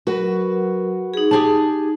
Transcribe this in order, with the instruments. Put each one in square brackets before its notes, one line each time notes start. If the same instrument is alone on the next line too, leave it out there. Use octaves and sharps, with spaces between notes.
[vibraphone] F#3 A#4 [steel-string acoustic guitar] F#4 B4
[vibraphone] D#4 G#4
[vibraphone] D#4 [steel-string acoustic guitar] G4 G#4 A5